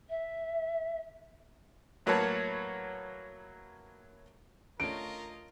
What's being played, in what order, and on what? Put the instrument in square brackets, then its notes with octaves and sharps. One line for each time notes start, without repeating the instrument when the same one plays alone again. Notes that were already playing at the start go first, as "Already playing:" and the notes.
[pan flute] E5
[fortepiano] A2 F#3 A#3 B4 C#5 A5
[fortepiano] D3 A3 C#4 [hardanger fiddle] F4 D#5 [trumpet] A#4 [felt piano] D7